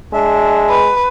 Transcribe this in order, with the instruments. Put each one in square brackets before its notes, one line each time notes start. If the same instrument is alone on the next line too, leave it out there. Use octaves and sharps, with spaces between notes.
[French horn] G#3 [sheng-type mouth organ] D4 E5
[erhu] B4